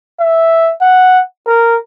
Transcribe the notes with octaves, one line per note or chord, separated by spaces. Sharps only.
E5
F#5
A#4